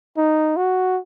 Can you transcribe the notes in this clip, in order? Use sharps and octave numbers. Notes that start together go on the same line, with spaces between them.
D#4
F#4